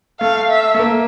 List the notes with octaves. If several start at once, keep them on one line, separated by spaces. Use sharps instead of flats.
A3 F5
E5
A3
A#3